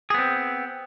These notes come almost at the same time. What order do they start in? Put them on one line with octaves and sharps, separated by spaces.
G#4 B3 C4